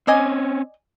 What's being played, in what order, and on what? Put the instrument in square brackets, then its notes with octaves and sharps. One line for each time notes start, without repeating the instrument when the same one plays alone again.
[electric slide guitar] C4 C#4 [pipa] D5 D#5 G#5